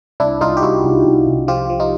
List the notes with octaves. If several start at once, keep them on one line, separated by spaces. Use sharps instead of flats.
C2 D4 E4
C2 D#4 F4
G4
C2 E4 F#4
C2
C2
C2
F3 F4 G4
F3
D#4 F4